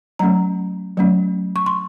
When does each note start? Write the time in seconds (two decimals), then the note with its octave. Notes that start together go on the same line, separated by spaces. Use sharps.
0.19 F#3 A3 C#4 A#5
0.97 F#3 A3 C#4
1.56 C#6
1.66 C6